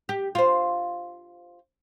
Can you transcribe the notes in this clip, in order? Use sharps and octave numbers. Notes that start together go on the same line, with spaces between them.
G4
F4 C5